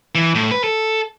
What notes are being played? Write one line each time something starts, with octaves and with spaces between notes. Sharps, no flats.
E3
A2
B4
A4